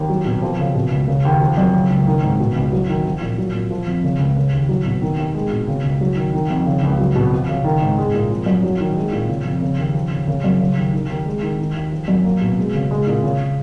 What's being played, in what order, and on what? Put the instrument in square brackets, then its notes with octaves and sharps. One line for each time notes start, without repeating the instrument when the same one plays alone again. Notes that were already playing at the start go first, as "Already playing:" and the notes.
Already playing: [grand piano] D#2
F#3
B2
F3
C#3
B2
C#2
C#3
D#2
F3
F#2
C#3
C#2
D#3
G#2
B2
C#2
F#3
D#3
F3
A#2
F#3
A#2
F3
F2
C#3
C#2
C#3
D#2
F#3
B2
D#3
D#2
G#3
B2
C#3
C#2
F#3
D#3
D#3
F2
C#3
C#2
F#3
B2
F3
C#3
D#3
G#2
G#3
A#2
F3
F#2
F#3
D#3
G#3
A#2
C#3
F2
C#3
D#2
F3
C#3
C#3
F#2
C#3
D#2
D#3
D#2
G#3
D#3
D#3
D#2
F3
F#2
A#3
B2
G#3
C#3
G#3
A#2
C#3